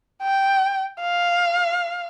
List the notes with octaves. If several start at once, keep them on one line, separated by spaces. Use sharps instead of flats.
G5
F5